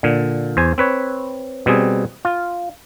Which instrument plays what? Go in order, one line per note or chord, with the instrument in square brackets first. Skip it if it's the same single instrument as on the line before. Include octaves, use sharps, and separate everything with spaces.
[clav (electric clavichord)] A#2 D3
E2 C5 G#5
C4 B4 C#5
B2 G3 C4 G#4
F4